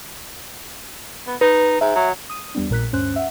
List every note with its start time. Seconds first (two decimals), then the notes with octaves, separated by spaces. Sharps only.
1.27 B3
1.41 D#4 B4
1.81 G#2 E5
1.96 F#3
2.30 D#6 D#7
2.55 E2 G3 B3 D4
2.70 A#1 A#2 A#4 F#6 B6
2.92 D2 G2 C#4 C5 F#6
3.16 E5 F#5